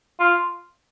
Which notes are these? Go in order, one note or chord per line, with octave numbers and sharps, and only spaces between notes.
F4